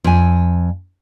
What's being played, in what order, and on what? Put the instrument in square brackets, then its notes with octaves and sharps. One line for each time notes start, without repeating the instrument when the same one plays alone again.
[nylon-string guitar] F2 G#5